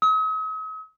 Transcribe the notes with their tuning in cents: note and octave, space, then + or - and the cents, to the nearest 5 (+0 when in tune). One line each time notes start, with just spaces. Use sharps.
D#6 +45